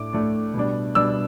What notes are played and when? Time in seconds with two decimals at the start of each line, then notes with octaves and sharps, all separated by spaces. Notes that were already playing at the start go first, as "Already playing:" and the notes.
Already playing: A2 A3 D4 D6
0.13 A2 A3 D4
0.54 B2 G3 D4
0.95 B2 G3 D4 E6